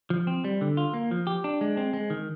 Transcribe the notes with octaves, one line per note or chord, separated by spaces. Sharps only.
F3
C4
G3
D3
F4
A#3
F3
G4
D4
G#3
C4
G#3
D#3